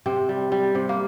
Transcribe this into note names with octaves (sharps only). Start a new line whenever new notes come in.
C3 C4
G3
G3
C3
A#3